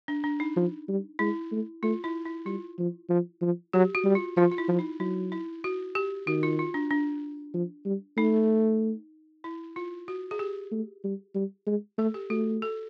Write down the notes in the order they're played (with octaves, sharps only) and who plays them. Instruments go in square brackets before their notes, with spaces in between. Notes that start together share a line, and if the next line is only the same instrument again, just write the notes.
[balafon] D4
D4
D#4
[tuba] F3
G3
[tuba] G#3 [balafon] E4
[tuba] A3
[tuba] A3 [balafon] F4
[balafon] E4
E4
[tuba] G3 [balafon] F4
[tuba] F3
F3
F3
[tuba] F#3 [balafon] G4
[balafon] F#4
[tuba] G3
[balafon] F4
[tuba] F3 [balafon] F4
[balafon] F4
E4
[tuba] F3
[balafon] D#4
[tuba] F#3 [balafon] E4
[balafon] E4
F#4
G4
[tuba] D#3 [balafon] F#4
[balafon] F4
F4
D4
D4
[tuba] F3
G3
[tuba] A3 [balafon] D#4
[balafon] E4
F4
F#4
G#4
G4
[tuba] A3
G3
G3
G#3
[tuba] A3 [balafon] A4
[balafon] G4
[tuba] A3 [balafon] F#4
[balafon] A4